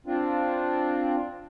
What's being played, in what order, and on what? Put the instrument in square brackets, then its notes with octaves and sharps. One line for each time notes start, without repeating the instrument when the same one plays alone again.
[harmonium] C4 D4 F4